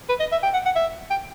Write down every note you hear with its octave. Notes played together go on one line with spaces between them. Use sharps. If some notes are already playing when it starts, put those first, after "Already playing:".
B4
D#5
E5
G5
F#5
F#5
E5
G5